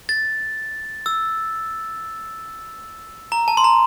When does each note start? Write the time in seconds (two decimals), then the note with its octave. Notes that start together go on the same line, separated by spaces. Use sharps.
0.09 A6
1.06 E6
3.32 A#5
3.48 A5
3.57 C6
3.64 A#5